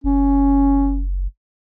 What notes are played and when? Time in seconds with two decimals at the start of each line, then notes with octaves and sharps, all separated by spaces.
0.04 F#1 C#4